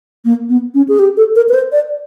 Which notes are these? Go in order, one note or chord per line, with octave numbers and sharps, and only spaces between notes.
A#3
B3
C#4
G#4
G4
A4
A#4
B4
C5
D5